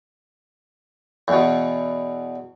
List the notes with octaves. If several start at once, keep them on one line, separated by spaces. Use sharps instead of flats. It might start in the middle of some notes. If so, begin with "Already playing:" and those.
E2 B2